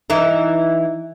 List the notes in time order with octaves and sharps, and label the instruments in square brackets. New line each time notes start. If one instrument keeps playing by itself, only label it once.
[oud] E3 D#4